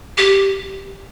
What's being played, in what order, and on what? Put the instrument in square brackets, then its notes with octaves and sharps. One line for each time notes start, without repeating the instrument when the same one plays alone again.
[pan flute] G4